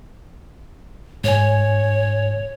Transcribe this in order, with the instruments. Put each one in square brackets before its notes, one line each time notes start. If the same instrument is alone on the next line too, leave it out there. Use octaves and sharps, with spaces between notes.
[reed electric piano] G#2 G#5 [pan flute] C#5